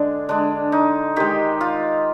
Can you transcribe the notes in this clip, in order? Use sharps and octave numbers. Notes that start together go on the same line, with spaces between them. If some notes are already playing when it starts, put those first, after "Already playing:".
Already playing: D3 G#3 D4
D3 G#3 D4
D#4
D#3 G#3 G4
F4